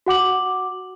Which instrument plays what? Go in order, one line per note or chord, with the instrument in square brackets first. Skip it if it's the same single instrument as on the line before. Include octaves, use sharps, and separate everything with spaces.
[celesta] F#4 F#5 D6 F#7